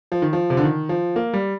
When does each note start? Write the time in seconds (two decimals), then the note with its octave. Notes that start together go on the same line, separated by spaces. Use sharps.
0.12 F3
0.22 D#3
0.33 F3
0.50 C3
0.57 D3
0.63 D#3
0.89 F3
1.16 A#3
1.33 G3